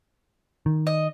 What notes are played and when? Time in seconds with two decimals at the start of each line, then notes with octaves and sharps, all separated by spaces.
0.66 D#3
0.87 D#5